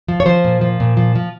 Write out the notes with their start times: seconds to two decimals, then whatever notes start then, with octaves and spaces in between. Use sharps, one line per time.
0.08 F3
0.20 C#5
0.26 F3 C5
0.45 A#2
0.61 F3
0.80 A#2
0.97 F3
1.15 F3